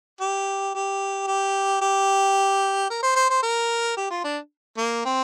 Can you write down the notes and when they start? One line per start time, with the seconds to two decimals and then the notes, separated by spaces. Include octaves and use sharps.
0.21 G4
0.75 G4
1.27 G4
1.81 G4
2.90 A#4
3.03 C5
3.16 C5
3.30 C5
3.43 A#4
3.97 G4
4.11 F4
4.24 D4
4.77 A#3
5.05 C4